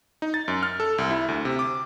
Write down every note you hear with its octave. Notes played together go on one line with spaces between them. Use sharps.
D#4
A6
F#2
F6
A4
C2
E4
D2
C3
D6